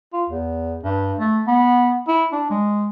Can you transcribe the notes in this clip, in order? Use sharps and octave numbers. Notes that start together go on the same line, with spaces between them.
F4
E2
G2
A3
B3
E4
D4
G#3